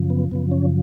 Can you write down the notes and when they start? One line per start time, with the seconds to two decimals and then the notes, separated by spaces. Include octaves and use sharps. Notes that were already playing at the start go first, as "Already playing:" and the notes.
Already playing: F#2 C#3 F3
0.10 B3
0.31 F#2 C#3 F3 B3
0.51 C#4